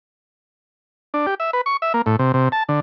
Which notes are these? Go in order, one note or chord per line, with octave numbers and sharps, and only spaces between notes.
D4
G4
E5
B4
C#6
E5
A#3
A2
C3
C3
A5
D3